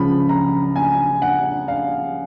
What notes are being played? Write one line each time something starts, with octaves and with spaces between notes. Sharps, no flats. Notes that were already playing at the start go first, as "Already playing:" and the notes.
Already playing: C#2 C#3 F3 B5
A#5
G#5
F#5
F5